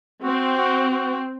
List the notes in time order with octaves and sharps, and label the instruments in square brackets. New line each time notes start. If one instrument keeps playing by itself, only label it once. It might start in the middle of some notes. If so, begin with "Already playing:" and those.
[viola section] C4 [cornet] F#4
[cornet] F#4
F#4